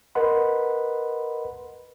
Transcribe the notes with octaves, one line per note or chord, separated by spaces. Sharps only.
A#4 B4 D#5 F#5 B5 C6